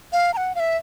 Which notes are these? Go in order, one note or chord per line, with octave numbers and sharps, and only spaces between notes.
F5
A#5
F#5
F5
E5